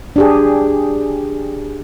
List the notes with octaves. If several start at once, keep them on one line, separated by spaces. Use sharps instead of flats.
D4 G4 G#4